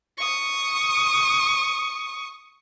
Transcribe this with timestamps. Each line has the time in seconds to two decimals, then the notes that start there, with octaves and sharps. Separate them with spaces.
0.18 C#6 D#6